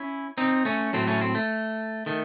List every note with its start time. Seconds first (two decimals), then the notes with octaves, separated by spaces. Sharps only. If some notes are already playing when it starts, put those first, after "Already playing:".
Already playing: C#4 E4
0.38 C4 D#4
0.65 A3 C#4
0.93 A2 F#3 A3 C4
1.07 A3 C#4
1.21 C4
1.35 A3
2.06 D#3 A3